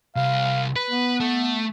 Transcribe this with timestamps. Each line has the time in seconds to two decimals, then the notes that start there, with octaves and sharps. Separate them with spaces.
0.16 C2 F5
0.76 B4
0.90 B3
1.20 A3